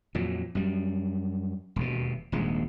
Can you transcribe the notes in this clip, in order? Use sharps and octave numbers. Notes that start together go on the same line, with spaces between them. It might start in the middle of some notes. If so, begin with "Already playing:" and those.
F2 A#2 F#3
F#2 G3
E1 D#2 B2
D#1 A#1 G#2 G#3